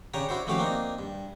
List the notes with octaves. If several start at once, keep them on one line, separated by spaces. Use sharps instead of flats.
C#3 D4 G4 C#5 A#5
D4 E4 F#4 C5
F3 A3 C#4 F#4 G4 F5
A#3 C4 D4 D#4
G2